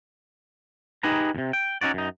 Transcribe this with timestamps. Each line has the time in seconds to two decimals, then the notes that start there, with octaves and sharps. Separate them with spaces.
1.03 D#4 G4 G#4 B4 A#5
1.35 D#2 C3
1.53 G5
1.81 C#4 D#4 F#4 D5
1.94 F#2 D#4